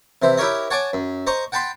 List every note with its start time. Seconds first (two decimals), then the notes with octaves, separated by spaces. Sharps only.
0.22 C3 E3 C5
0.37 E4 G4 A#4 C#5 D#5
0.70 C#5 F#5 G#5 A5 D6
0.93 F#2
1.27 C5 D#5 A#5 C#6
1.52 F#5 G5 A5 B5 C6